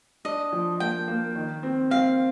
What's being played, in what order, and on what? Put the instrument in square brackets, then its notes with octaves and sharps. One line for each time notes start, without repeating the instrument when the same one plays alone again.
[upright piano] D4 [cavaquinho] D#5
[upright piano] F3
[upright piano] A#3 [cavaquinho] G5
[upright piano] A#3
D#3
C4
[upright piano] C4 [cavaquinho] F5